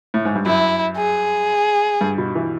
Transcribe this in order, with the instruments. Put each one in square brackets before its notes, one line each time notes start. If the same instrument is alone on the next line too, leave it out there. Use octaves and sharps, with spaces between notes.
[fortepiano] A2
G#2
G2
[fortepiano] F#2 [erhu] E4
[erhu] G#4
[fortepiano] G2
B2
E3